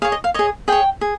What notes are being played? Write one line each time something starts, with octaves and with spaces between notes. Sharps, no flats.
G#4 C#5 F5
D#5
F5
G#4 C#5 D#5
G#4 C#5 G5
G#4